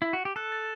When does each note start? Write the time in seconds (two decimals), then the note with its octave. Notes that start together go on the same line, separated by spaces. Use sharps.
0.02 E4
0.13 F#4
0.25 G4
0.36 A4 F#6
0.52 A6